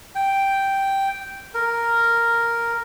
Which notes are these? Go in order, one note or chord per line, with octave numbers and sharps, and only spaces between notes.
G5
A#4